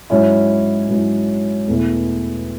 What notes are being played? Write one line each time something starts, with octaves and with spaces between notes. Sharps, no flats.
G#2 F#3 C#4 E4
G#2 F#3 C#4 E4
E2 B2 A3 E4